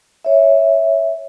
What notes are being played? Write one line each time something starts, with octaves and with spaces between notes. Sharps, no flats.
C#5 E5